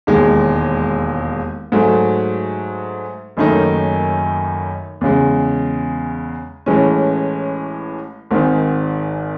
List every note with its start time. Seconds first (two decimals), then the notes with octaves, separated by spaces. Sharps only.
0.07 E1 D#2 D#3 G#3
1.72 G#2 F#3 A3
3.37 F#1 F#2 D#3 A3 D#4
5.01 E2 C#3 G#3
6.66 A1 A2 E3 G#3 C#4
8.31 G#1 G#2 D#3